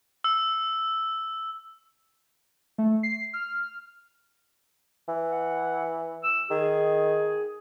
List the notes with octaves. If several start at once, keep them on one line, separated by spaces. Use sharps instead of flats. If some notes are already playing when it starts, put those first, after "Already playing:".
E6
A3
C7
F6
E3
F#5
E6
D#3 G#4